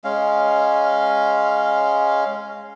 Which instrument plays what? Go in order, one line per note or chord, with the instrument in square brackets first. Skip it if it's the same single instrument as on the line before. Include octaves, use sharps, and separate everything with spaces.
[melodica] G#3 C#4 F5